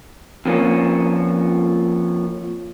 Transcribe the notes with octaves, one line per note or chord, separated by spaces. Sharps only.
F2 F3 A#3 C#4